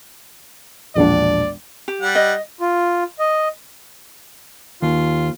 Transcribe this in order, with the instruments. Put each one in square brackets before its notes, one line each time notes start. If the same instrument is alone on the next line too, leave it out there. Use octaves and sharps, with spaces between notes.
[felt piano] E1 A#1 D4 [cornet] D5
[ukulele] G4
[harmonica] G3 F#5
[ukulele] D#5
[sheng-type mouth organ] F4
D#5
[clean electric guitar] D#2 [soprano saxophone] F4